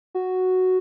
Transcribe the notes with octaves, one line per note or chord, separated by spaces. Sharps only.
F#4